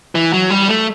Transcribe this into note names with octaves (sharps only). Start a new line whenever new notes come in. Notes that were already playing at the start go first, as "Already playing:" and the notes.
E3
F#3
G3
A3